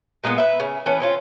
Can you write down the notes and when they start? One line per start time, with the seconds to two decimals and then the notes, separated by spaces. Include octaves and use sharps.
0.24 A#2 G#3 A#3 B3
0.38 B4 E5
0.60 C#3
0.86 E3 A3 B3 C#4
1.00 C4 C#4 F4